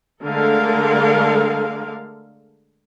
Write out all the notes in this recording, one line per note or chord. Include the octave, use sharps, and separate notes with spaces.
D3 G#3 A3 A4 A#4 F5